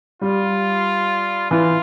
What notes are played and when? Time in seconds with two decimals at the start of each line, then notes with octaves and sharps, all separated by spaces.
0.22 G3 F4
1.51 E3 F4